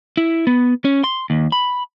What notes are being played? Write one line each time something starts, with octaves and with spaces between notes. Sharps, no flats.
E4
B3
C#4
C6
D#2
B5